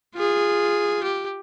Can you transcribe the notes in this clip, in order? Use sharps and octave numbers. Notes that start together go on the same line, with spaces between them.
F4 G#4
G4